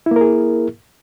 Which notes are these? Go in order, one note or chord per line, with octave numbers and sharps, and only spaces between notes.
A#3 E4 G#4 A#4